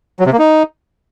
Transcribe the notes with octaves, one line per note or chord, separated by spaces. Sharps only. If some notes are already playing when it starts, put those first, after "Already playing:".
F#3
C3
A#3
D#4